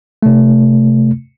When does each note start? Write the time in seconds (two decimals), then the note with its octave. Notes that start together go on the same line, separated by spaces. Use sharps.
0.23 C3 A3